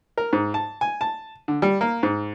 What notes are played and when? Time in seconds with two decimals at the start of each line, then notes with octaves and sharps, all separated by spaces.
0.18 A#4
0.33 G#2
0.54 A5
0.81 G#5
1.01 A5
1.48 D3
1.62 G3
1.81 A#3
2.03 G#2